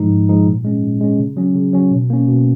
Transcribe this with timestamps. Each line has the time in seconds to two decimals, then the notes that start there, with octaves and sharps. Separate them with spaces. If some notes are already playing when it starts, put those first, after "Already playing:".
Already playing: G#2 F3 G#3 D#4
0.10 G#2
0.29 F3 G#3 D#4
0.46 A#2
0.65 G#3 C#4
0.83 A#2
1.01 G#3 C#4
1.19 C#3
1.37 F#3 C#4
1.55 C#3
1.73 F#3 C#4
1.91 B2
2.10 A#3 C#4
2.28 B2